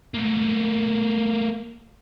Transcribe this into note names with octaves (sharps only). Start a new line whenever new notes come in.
A3 A#3